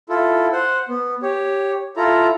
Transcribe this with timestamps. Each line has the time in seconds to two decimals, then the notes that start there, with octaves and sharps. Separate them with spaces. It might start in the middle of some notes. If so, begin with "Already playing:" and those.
0.09 E4 F4 A4
0.52 C5 F#5
0.89 B3
1.22 G4 C#5
1.97 E4 F4 A4 A#5